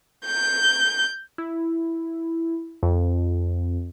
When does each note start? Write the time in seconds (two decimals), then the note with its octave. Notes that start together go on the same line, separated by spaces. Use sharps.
0.25 G6
1.38 E4
2.83 F2